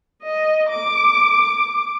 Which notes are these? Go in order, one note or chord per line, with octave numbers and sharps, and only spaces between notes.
D#5
D6